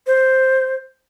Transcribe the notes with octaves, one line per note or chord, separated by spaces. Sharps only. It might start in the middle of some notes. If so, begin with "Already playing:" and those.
C5